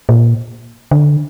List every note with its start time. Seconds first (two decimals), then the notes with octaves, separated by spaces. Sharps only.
0.09 A#2
0.91 D3